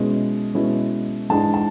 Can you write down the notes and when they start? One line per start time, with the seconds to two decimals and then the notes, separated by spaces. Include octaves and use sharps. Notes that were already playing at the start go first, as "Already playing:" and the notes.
Already playing: B2 G#3 C#4 E4
0.54 B2 G#3 C#4 E4
1.29 G#2 E3 G#3 D4 A5
1.54 A5